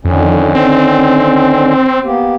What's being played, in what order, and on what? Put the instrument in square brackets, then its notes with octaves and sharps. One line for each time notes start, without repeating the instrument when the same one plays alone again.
[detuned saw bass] F2 [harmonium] D3 D#3 C#4
[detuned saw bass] C4
[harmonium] A#3 B3 G4